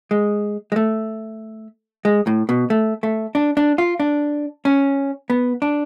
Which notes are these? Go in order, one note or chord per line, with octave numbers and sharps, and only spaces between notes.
G#3
G#3
A3
G#3
A2
B2
A3
A3
D4
D4
F4
D4
C#4
B3
D4